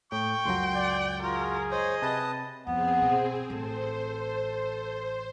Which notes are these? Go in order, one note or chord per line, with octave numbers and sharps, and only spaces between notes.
A2 G5 C#6
C#2 F#2 F#3 C6
D5
F4 F#4 G#4 A#4
C5 C#5 D#5
C3 B4 A5 D#6
F2 B3 C4 G#4
B2
A1 A4 C5